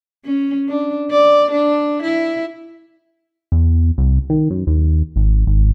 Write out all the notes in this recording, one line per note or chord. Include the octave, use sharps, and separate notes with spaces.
C#4
D4
D5
D4
E4
E2
C2
D#3
F#2
D#2
G#1
G#1